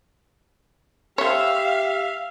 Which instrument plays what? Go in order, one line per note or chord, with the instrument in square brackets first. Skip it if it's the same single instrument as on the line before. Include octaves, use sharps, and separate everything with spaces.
[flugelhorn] G4 [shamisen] C5 C#5 [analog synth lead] E5 [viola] F5